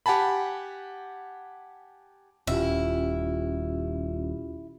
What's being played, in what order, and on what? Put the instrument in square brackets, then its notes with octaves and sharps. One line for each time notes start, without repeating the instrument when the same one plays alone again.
[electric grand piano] G4 F#5 G#5 A5 B5
[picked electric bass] D#1 [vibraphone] C#4 F4 G4 [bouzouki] E4